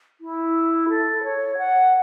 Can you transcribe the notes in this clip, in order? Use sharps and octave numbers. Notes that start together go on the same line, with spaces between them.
E4
A4
C#5
F#5